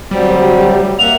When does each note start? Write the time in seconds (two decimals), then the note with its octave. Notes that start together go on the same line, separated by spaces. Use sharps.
0.11 D2 F#3 G3 C4
0.99 A#3 E5 F#5 F7